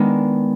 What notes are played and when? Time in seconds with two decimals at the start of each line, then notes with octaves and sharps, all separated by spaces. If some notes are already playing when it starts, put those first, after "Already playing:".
Already playing: D#3 G#3 B3 D4